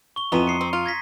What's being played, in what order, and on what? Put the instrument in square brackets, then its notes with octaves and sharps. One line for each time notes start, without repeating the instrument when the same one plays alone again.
[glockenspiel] C#6 G7
[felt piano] F2 [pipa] E3 F3 B3 [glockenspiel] A#5 C6 D#7
[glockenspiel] D#6 C7 C#7
[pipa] C4
F4
[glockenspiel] G#6 A#6 B6